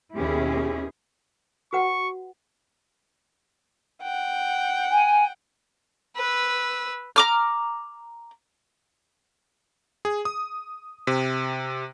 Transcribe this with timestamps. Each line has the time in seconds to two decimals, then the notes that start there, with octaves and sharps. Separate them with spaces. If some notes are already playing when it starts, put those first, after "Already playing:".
0.16 D#2 B2 C#4 E4 G4 G#4
1.73 F#4 B4 F#5 C#6
4.02 F#5 G5
4.91 G#5
6.17 B4 E6
7.16 A#5 D6 F6
10.05 G#4
10.25 D#6
11.07 C3